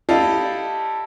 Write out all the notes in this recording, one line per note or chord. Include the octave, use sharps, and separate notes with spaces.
E4 G4 A4 D5 D#5 F5